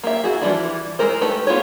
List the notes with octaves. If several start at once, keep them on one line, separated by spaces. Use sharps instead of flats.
A#3 G4 E5
E4 F#4 G#4
E3 F3 G3 D4 E4
G#3 C4 E4 A#4 C5
A3 G4 B4
B3 F4 G4 G#4 C#5